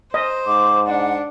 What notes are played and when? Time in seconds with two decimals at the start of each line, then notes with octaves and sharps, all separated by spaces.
0.14 C5 D#5
0.46 G#2 D6
0.87 D4 F#5